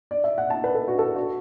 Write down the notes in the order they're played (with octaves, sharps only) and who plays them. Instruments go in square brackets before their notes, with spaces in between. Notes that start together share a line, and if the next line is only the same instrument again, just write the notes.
[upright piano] D5
E5
F#5
A5
B4
A4
F#4
A4
F#4